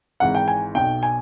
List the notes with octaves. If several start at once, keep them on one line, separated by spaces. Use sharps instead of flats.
G#1 G#2 E3 F#5
G5
G#5
B1 B2 G5
G#5